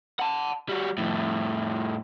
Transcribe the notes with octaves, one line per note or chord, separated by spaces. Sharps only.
F#5 A5
G3 F#4
F2 A2